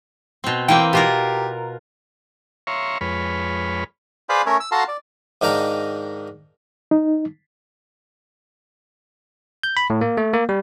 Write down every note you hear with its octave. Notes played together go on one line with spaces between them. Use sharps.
B2 C4
E3 A#3 C4 G5
B2 F4 G4 A#4
C#5 E5 F5 A#5 C6 C#6
F2 G#3 B4 C#5 B5 F6
G#4 B4 C5 D5 F5 B5
A3 C#4 A#4 C#5 E5
E6
F#4 A4 F5 A5 A#5 C6
D5
G#2 D#3 D4 F5 G5 A#5
D#4
G6
B5
A2
A#3
A3
A#3
G3